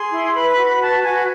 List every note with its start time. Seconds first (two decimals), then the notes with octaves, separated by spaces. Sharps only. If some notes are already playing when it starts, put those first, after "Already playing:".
Already playing: G#4 C6
0.11 E4
0.34 B4 B5
0.51 B5
0.58 F#4
0.65 B5
0.81 B4 A5
1.04 F#4 G#5